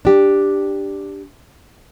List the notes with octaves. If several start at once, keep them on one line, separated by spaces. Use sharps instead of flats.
D4 G4